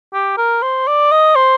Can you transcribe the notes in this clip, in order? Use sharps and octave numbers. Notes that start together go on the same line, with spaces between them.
G4
A#4
C5
D5
D#5
C5